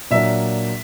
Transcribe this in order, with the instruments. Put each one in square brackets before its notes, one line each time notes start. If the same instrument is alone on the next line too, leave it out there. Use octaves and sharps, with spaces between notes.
[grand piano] A#2 F#3 A#3 D4 [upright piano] E5